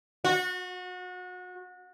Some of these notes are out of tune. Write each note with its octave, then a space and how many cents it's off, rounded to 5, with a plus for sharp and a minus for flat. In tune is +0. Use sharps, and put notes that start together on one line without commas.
F#4 -30